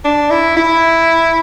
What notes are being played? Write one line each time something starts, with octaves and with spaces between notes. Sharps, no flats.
D4
E4
E4